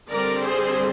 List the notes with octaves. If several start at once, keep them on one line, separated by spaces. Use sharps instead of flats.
D3 G3 C4 A#4 D5
G#4 C5